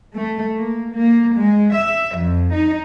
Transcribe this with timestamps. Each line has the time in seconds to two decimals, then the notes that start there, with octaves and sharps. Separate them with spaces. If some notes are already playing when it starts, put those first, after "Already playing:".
0.14 A3
0.58 A#3
0.93 A#3
1.34 G#3
1.73 E5
2.15 F2
2.53 D#4